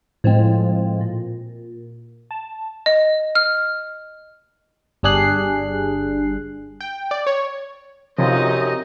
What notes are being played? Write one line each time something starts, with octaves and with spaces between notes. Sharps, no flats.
A2 F3 G#3 C4
A#2
A5
D#5
F6
G1 G3 D4 G#4 F#6 C7
G5
D5
C#5
F#2 C3 F3 C4 D#4 F4 D#5